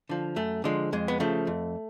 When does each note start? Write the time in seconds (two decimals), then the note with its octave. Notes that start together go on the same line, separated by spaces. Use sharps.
0.09 D3 F3
0.36 F#2 A3
0.64 D3 F3 G#3
0.93 F2 G#3
1.08 B3
1.20 C#3 F3 A3
1.47 F2